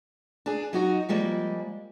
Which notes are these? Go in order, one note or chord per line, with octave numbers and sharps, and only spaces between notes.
D4 G#4
F#3 D#4 F#4
F3 G3 G#3 A#3